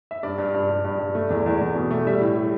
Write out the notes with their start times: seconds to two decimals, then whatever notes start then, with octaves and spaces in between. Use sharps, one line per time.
0.11 E5
0.23 G2 D5
0.38 G2
0.54 G2
0.70 G2
0.85 G2
0.99 G2
1.15 A3
1.30 E2
1.46 E2
1.61 E2
1.75 B2
1.91 A3
2.07 G3 E5
2.21 A2
2.37 G3